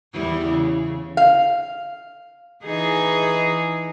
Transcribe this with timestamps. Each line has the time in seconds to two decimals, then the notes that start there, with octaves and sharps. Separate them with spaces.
0.13 E2 G3 E4
0.48 C#3
1.17 F5
2.64 E3 D#4 G#4